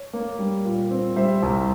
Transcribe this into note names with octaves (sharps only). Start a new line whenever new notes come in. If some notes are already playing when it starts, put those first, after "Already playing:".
Already playing: C#5
A#3
G3
A#2
C4
G3 C5 E5
C2